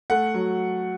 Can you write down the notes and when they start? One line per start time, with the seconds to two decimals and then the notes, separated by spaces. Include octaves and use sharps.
0.10 A3 F#5
0.34 F#3